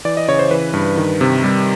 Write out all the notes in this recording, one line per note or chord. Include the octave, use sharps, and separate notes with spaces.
E3 D5
D#5
C#3 C#5
C5
E3 B4
G2
D#3
C3
G3